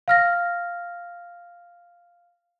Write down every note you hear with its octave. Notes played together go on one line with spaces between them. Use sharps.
F5 F6 A#6